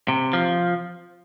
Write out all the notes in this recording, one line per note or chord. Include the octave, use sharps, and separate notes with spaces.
C3
F3